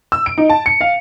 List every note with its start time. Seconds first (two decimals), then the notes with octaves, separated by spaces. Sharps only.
0.12 E6
0.26 D7
0.38 D#4
0.50 A5
0.66 C#7
0.81 F5